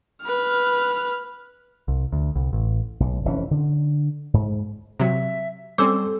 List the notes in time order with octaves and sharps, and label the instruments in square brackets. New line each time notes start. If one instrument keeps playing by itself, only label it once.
[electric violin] B4 F6
[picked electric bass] C2
D2
C2
A1
[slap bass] B1
F1 E3 C#4
D3
G#2
[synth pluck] C3 F#3 [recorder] E5
[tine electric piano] G3 [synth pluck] C4 C#4 C5 [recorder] A4 [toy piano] D6 E6